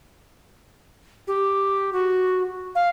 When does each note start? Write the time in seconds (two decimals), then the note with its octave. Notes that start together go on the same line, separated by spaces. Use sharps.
1.27 G4
1.93 F#4
2.75 F5